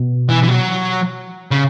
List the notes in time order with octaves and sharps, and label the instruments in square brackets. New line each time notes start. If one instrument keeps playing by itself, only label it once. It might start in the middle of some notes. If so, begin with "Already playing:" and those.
Already playing: [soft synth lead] B2
[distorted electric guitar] E3
E3
F#3
C#3